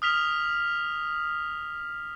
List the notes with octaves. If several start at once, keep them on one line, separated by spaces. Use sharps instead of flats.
D#6 F6 B6 F7